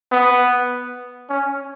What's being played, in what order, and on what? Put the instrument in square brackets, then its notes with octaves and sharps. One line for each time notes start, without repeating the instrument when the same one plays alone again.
[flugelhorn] B3
C#4